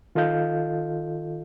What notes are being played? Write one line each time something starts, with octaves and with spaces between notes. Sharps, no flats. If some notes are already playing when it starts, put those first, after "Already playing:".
D#3 F4 A4 D#5 F5 G6